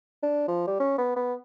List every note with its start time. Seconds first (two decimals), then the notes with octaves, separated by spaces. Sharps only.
0.23 D4
0.48 F3
0.67 G3
0.80 C#4
0.98 B3
1.16 B3